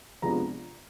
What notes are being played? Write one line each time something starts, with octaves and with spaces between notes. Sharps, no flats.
C3 F3 G#3 B3 D4 A#5